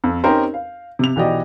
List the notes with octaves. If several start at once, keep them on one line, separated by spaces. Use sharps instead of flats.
F2
C4 C#4 D#4 G4 A#4 C5
F5
C3 F7
B1 E3 F#4 G4 D5 D#5